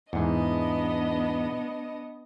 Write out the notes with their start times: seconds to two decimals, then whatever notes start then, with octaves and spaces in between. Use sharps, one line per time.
0.13 E2 G#2 B3 D4 D#5